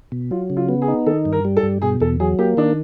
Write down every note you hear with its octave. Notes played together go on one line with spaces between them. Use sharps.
B2
F#3 F4
C#3
F4
B3
G#4
D#4
D#3 A4
G2
A#4
G3
A4
G2
B2 G#4
E2 A4
F#3 G#4
A#3 G4
D#3 D4